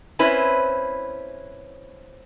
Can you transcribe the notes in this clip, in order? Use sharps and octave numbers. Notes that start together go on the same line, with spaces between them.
C4 C#4 E4 B4 C5